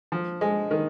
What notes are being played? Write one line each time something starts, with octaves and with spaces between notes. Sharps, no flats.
F3
G#3
D#3